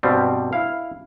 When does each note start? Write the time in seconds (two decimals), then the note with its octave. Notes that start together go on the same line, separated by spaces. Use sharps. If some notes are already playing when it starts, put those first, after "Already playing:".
0.03 G2 B2 G3 C4
0.53 E4 F5